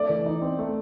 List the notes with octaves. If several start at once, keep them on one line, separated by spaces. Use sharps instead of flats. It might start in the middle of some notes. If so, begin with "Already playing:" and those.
Already playing: A3 D5
E3
D#4
C4
A3